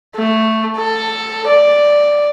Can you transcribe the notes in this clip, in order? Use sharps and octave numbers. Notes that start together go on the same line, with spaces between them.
A3
A4
D5